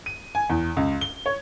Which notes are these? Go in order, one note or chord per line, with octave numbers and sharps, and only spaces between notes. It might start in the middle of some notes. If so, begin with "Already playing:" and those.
D#7
G#5
E2
C#2
G7
C#5